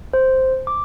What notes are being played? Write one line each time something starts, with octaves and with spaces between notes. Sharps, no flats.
C5
D6